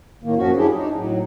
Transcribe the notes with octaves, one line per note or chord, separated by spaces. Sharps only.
A2 D#3 A#3
F#2 A#2 F3 C#4 F#4
F#3 D4 E4 G4 G#4
D4 D#4
A2 F#3